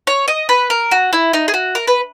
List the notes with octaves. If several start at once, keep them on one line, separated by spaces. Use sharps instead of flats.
C#5
D#5
B4
A#4
F#4
E4
D#4
G#4
F#4
A#4
B4